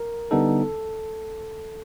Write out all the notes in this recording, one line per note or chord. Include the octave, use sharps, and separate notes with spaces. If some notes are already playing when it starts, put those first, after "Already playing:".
Already playing: A#4
D3 G3 B3 D#4 A4